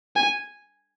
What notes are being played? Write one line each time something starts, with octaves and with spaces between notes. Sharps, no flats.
G#5